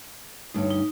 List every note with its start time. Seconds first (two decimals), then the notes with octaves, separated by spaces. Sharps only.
0.54 D2 G2 D#4 C#5
0.71 D#4